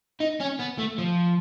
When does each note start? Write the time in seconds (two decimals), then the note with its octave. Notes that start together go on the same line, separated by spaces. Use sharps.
0.20 D#4
0.40 C#4
0.59 B3
0.78 A3
0.98 F3